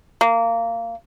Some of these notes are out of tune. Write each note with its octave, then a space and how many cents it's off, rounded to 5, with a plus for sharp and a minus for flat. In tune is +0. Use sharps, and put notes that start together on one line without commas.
A#3 -20